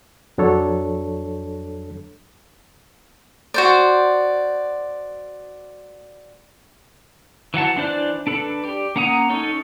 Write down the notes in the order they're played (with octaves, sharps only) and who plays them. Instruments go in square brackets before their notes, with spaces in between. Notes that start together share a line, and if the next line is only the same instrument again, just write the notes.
[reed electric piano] F2 F#3 D4 A4 C#5
[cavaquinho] F#4 C5 D5
[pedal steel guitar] E3 F#3 F#5 A5
E3 D4 C5 D5 F#6
D4 A4 B4
G4 D5
A#3 C#4 F#5 A#5 D#6
C#4 D#4 A4 C#5